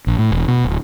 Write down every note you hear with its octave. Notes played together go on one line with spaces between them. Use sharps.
A#1
A2
E1
B2
D1